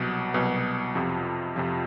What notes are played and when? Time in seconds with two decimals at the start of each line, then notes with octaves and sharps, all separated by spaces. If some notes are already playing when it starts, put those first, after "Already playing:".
Already playing: C2 B2 F#3
0.34 C2 B2 F#3
0.95 F2 C3 F3
1.56 F2 C3 F3